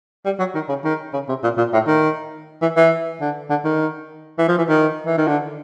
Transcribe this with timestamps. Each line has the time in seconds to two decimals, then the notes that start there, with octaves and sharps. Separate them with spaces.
0.25 G3
0.39 F#3
0.55 D#3
0.69 C#3
0.85 D#3
1.14 C#3
1.28 C3
1.43 A#2
1.58 A#2
1.73 A2
1.87 D#3
2.62 E3
2.76 E3
3.21 D3
3.50 D3
3.65 D#3
4.38 E3
4.48 F3
4.58 E3
4.69 D#3
5.06 E3
5.17 D#3
5.28 D3